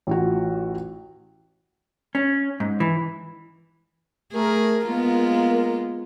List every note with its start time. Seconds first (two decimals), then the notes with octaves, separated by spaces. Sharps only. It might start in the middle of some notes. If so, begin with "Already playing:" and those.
0.07 A1 F4 F#4
2.15 C#4
2.60 G#2
2.80 E3
4.33 A3 G#4 A#4
4.87 G#3 A#3 B3 F4